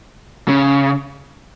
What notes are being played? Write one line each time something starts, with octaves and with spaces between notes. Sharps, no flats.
C#3